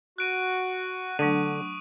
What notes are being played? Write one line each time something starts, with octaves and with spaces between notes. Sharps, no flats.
F#4 F#6 D7 D#7
D3 F#3 A3 D4 C#6 D#6 D#7